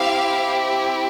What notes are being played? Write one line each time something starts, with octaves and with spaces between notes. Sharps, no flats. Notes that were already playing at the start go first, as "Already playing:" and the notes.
Already playing: C4 E4 G4 F5